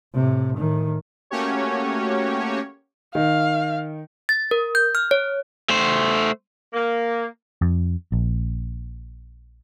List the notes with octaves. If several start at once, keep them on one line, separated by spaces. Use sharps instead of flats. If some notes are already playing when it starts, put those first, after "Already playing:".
A2 C3
A2 D#3
A3 A#3 C#4 F#4 G4 C#5
D#3 F5
A6
A#4
G6
F6
C#5
A3 C5
A#3
F2
A#1